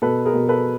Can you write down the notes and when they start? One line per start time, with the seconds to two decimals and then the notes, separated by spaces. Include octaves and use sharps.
0.02 B2 A4 B4
0.26 G#4 A#4
0.33 B2
0.48 A4 B4